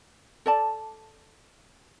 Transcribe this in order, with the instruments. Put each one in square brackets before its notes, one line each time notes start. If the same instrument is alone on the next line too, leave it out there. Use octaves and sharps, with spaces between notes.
[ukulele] A4 D5 A5